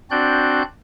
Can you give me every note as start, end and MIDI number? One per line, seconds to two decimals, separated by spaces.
0.11 0.62 60
0.11 0.62 62
0.11 0.62 66
0.11 0.62 74
0.11 0.62 90
0.11 0.62 91